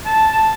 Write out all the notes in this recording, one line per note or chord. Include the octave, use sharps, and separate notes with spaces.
A5